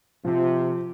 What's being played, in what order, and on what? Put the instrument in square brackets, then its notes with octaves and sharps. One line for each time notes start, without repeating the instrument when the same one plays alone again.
[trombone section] C3 [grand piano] F3